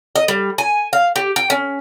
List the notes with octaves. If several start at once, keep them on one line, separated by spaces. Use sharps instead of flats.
D#5
G3
G#5
F5
G4
G5
C#4